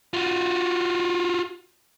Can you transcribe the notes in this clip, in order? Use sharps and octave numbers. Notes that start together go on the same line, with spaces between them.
F4 F#4